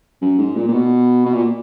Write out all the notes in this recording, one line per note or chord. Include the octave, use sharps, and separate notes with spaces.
F#2
G#2
A#2
A#2
B2
B2
A#2